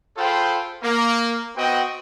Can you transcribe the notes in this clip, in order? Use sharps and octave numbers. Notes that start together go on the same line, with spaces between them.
F4 G#4 A4 C5 G5 B5
A#3
B3 C4 F#4 D#5 G5